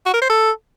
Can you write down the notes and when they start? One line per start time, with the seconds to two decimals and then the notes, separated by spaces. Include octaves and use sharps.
0.06 F#4
0.14 A#4
0.22 C5
0.30 A4